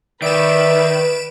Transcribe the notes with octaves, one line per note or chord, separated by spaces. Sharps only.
D#3 B4 D5 E5 D7 E7